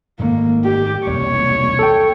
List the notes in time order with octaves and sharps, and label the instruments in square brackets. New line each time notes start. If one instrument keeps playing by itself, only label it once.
[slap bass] G#2 D#3 A3 [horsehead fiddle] A#3
[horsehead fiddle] G4
[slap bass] E1 C2 A#3 [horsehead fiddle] C#5
[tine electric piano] A4 G5